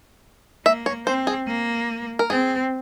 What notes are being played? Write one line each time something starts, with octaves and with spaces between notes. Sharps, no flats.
A#3 E5
C#5
C4 C5
G#4
A#3
A#4
C4 G#4